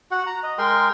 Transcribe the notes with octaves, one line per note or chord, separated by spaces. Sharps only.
F#4 F#5
A#5
D#5
G#3 A#4 G5 C6